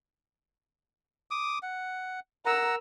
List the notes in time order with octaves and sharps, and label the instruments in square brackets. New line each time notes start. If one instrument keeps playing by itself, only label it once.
[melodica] D6 D#6
F#5
[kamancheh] A#4 E6 [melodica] F#5 A#5